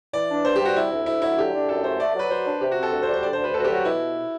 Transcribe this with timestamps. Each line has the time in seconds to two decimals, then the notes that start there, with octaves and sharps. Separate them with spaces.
0.13 E3 D5
0.30 D4
0.45 G2 C5
0.56 G4
0.60 G3
0.65 F#4
0.76 C3 E4
0.91 D2
1.06 D2 E4
1.22 F#3 E4
1.38 D3 G4
1.54 D4
1.69 F#2 A4
1.84 A3 C5
2.00 A3 D5
2.16 F#3 B4
2.30 F#3 C5
2.45 D4
2.61 C3 G4
2.71 F#4
2.77 C4
2.83 A4
2.92 D2
3.03 C5
3.08 G3
3.14 C5
3.23 D3 D5
3.33 C5
3.39 D2
3.44 B4
3.54 D2 A4
3.60 F#4
3.64 G4
3.70 F#3 F#4
3.85 B2 E4